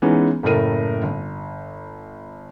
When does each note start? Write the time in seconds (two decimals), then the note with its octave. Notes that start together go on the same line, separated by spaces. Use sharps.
0.02 E3 G#3 B3 C#4 D#4
0.43 F#1 A2 A3 A#4 D#7
1.03 G1